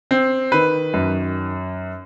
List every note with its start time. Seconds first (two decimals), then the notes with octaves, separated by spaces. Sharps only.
0.11 C4
0.52 D#3 B4
0.94 F#2